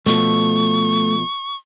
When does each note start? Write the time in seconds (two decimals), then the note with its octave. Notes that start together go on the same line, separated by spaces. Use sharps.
0.06 B2 F3 A3 C#6